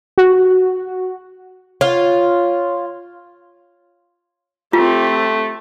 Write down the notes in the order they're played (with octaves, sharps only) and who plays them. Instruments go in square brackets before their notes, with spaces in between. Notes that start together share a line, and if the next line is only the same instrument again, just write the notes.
[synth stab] F#4
[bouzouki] F4 [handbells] C#5
[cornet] A3 [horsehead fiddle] C4 G4 [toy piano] F4